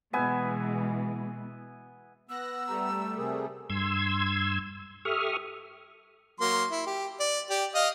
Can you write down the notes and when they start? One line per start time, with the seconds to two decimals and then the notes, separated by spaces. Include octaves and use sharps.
0.13 B2 E3 G#3 B3 E5 G#5
2.29 B3 E6 F#6 A#6
2.68 G3 A3 A#5
3.17 C3 G#4 A#4
3.70 G2 C6 E6 G#6
5.05 G4 A4 E5 C#6 D#6 F6
6.40 F#3 A#3 C6
6.71 E4
6.86 G4
7.20 D5
7.50 G4 D5
7.75 D#5 F5 D#6